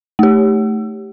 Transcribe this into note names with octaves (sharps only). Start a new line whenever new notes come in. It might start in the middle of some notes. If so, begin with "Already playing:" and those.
A3 G4